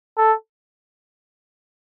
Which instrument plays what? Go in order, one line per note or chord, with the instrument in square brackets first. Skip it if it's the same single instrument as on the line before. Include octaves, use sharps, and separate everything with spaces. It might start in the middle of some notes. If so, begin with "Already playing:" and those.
[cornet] A4